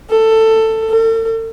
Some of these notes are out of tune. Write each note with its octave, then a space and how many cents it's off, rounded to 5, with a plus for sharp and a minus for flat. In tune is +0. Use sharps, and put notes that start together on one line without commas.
A4 +15
A4 +45